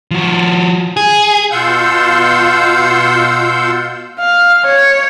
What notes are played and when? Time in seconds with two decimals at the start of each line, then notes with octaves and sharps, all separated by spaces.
0.11 F3 F#4
0.97 G#4
1.51 B2 F4 F5 F#5 E6 G6
4.20 F5
4.66 C#5